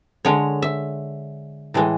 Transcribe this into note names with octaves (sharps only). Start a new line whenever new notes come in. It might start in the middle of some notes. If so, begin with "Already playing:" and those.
D3 G#3 C#5
E5
A2 E3 G#3